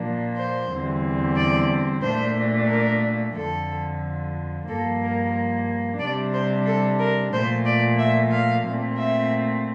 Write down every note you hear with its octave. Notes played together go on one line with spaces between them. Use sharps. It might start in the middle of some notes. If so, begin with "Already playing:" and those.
Already playing: A#2 F3 A#3 D4
C5
E2 D3 G3 C4
D5
A#2 A3 D4 C5
A#4
F2 D3 F3 A4
G2 F3 A#3 A4
A#4
C3 G3 D4 D5
C5
A4
A#4
A#2 F3 A3 C5
D5
E5
F5
A#2 A3 C4
E5